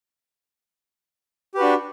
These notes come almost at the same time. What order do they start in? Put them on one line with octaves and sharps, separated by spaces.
G4 B4 F#4 D4